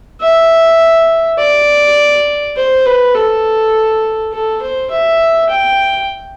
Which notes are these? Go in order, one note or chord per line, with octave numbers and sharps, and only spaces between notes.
E5
D5
C5
B4
A4
A4
C5
E5
G5